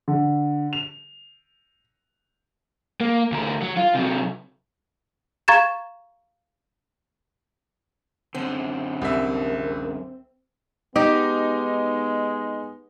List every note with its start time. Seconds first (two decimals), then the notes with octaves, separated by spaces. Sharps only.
0.08 D3
0.73 F7
3.01 A#3
3.32 D2 A#4
3.62 F#3
3.77 F4
3.95 C3 F#3
5.48 F5 A#5 C#6 G#6 A6 E7
8.35 F#2 D3 C4
9.02 C2 A#4 E5
10.96 G#3 B3 D#4 G4